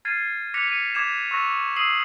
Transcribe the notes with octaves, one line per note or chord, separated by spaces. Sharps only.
F6 G#6 A6 C7 D#7
D6 F#6 A#6 B6 C#7 F7
C#7 D#7
D6 G#6 B6 E7
C#6 E6 F#6 A#6
D#6 E6 C7 D#7 E7 F#7